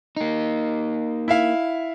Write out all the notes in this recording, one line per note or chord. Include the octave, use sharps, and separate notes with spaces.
A#3 D#4
E4 E5 F5